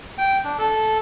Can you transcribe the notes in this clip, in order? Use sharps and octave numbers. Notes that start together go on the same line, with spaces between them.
G5
D4
A4